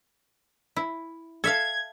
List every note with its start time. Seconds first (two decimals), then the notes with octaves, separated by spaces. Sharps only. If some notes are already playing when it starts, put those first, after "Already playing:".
0.76 E4
1.44 A4 E5 F5 G#6